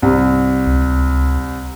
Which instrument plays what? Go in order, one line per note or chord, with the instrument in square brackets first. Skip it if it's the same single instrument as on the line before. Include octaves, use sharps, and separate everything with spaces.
[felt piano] C2
[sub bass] C#2